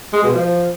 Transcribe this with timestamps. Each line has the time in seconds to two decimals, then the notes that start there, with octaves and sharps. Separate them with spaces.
0.13 G#3
0.23 B2
0.33 F3